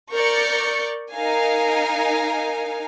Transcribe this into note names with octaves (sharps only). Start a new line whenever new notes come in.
A#4 D5 C#6 G6 C#7
D#4 A#4 F5 G#5